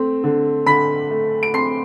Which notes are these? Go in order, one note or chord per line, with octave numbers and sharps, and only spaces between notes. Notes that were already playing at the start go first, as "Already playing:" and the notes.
Already playing: A3 C4
D3
D3 B5 B6
A3
D7
C4 C6 C7